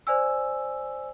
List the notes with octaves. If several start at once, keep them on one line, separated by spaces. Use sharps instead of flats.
C5 D5 G#5 E6